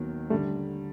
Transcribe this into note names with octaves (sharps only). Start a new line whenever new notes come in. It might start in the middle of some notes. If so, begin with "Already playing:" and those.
Already playing: D#2 D#3 F#3 A#3 B3
D3 G3 A3